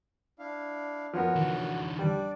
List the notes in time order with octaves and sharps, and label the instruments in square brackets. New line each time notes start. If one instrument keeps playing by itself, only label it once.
[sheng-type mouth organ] D4 E4 F5
[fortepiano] F3 B3 A#4 [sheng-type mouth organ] F#4 C#5
[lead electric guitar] D3 E3
[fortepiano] G3 [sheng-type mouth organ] D4 D5